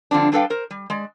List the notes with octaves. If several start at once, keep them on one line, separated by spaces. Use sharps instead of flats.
G2 D3 F3 C4 D4
G3 D4 A4 B4 F5 G5
A#4 C5
G3
G#3 D5